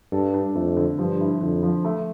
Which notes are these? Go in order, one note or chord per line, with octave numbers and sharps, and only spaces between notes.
G2 A4
D4
F2 A3
D3
G2 F3
E4
F2 D3
F3
A3